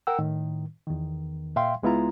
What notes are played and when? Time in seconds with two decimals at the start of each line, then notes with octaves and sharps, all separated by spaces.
0.07 A#4 F#5 G5 E6
0.19 A2 D#3
0.87 E2 D#3
1.56 A#2 E5 F5 G5 C6
1.83 C#2 G#3 B3 E4 F4 A#5